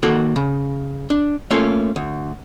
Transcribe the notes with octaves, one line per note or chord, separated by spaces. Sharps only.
D#3 A#3 F#4 A4 F#5
C#3
D4
A3 A#3 C#4 F4 A4
D2